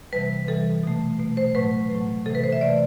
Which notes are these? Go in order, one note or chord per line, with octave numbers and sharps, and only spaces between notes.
C3 E3 G3 B4
C3 E3 G3 A4
B2 A3
B2 A3
C5
A2 F#3 A3 B4
A2 F#3 A3
C3 E3 A3 A4
B4
C5
E5
C3 E3 A3 D5